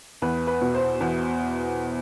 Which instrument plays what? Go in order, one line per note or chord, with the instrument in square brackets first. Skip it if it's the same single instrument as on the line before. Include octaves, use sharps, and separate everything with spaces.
[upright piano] E2 B4
B4
B2
C5
E2